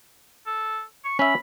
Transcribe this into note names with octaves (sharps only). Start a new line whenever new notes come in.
A4
C#6
C#4 E5 B5